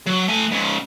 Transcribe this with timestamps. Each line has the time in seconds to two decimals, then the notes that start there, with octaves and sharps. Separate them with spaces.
0.06 F#3
0.28 A3 G#5
0.51 G#2 C#3